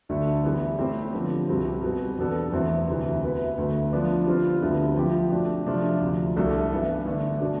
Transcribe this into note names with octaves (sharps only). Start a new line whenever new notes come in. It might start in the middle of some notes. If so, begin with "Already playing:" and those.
D2 D3 A3 D4 A4
E3 G3 B3 E4 B4
A2 G3 C4 G4 C5
D3 F3 B3
C2 B2 G3 C4
B2 G3 B3
E2 B2 B3 D4 A4
E2 B2 A3 C4 E4
D2 C3 E3
B2 B3 E4 B4
D2 D3 A3
F3 B3 D4
D3 G3 C4 F4 C5
D2 D3 G3 B3 E4
F3 C4 E4 G4
B2 A3 D4
C3 F3 A3 D4 F4
D2 C3 F3
C2 B2 A3 D4 A4
G2 E3 B3
D3 A3 D4
B2 A3 D4